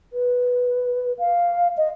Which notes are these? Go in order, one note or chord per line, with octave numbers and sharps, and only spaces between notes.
B4
F5
D#5